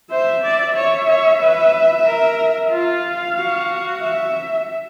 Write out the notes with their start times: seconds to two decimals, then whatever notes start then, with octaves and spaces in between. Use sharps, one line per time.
0.11 C5 E5
0.44 D5
0.76 C#5 E5
1.09 C#5
1.42 B4
2.06 A#4
2.72 F4 F5
3.37 F#4
4.02 E5